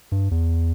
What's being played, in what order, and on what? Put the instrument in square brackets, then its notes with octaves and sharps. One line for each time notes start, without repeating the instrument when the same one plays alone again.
[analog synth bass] G2
E2